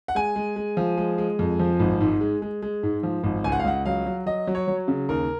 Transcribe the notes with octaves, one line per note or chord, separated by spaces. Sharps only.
F#5
G#3 G#5
G#3
G#3
F3
G#3
G#3
F2
F3
G#1
G#2
G#3
G#3
G#3
G#2
F3
G#1
C#2 G#5
F#5
F5
C#2 F#5
F#3 F5
F#3
F#3 D#5
F#3
C#5
F#3
C#3
D#2 A#4